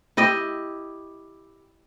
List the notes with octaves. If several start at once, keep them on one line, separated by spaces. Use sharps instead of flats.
E4 G4 D#5